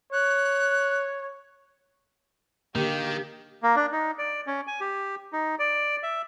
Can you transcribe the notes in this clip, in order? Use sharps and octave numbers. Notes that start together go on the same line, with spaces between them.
C#5 F#6
D3 D#3 A#3 G4
A#3
D4
D#4
D5
C#4
G#5
G4
D#4
D5
E5